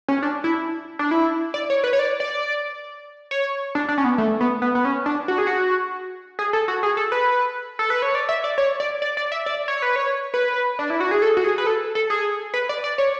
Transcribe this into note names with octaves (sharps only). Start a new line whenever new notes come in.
C#4
D4
E4
D4
E4
D5
C#5
B4
C#5
D5
D5
C#5
D4
D4
C#4
B3
A3
B3
B3
B3
C#4
D4
F#4
G#4
F#4
G#4
A4
F#4
G#4
A4
B4
A4
B4
C#5
D5
E5
D5
C#5
D5
D5
D5
E5
D5
C#5
B4
C#5
B4
D4
E4
F#4
G#4
A4
F#4
G#4
B4
A4
A4
G#4
B4
D5
D5
C#5